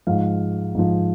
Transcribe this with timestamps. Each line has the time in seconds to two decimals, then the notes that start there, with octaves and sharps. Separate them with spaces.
0.07 G#2 F3 F5
0.75 G#2 F3